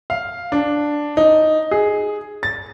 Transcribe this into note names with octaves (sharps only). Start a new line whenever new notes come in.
F5
D4
D#4
G#4
A6